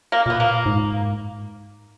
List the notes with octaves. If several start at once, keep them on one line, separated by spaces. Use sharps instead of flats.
A#3
A#2 B3
A#3
G#2